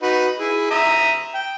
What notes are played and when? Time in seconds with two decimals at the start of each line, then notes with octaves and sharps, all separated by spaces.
0.02 D#4 F#4 B4
0.38 E4 G#4
0.71 E5 A#5 D#6
1.34 G5